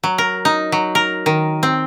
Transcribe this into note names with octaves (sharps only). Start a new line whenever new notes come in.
F#3
A#4
D#4
F#3
A#4
D#3
C4